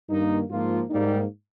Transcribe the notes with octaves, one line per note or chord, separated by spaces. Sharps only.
G2 D#3 A#3 D#4
G#2 F3 A#3 F4
G#2 G3 A#3 D#4